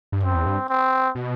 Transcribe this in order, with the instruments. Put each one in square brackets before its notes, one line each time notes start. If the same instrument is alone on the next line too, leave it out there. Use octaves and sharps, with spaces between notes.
[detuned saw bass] G2
[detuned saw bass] F#2 [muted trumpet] C4
[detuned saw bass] E2
G2
[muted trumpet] C4
[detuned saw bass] B2